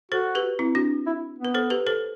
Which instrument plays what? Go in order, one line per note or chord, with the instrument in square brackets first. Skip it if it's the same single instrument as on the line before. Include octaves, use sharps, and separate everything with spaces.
[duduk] F#4 [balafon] A4 C5
[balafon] G4 B4
C4 E4
D4 F#4
[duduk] E4
B3
[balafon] B4
A4 C5
G4 B4
A4 C5